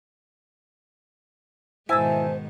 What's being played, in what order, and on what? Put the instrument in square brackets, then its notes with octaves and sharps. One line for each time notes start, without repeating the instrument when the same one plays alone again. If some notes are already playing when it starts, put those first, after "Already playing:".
[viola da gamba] G#2 B2 D#3 [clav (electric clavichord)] E4 [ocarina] C5 [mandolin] G#5 A5 E6